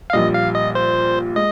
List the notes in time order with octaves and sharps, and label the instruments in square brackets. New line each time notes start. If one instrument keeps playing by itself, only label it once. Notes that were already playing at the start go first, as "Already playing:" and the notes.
[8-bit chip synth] F5
[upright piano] A#1 A#2 G3 [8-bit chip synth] D#5
[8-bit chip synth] F5
D#5
C5
[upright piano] G#3 [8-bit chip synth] D#5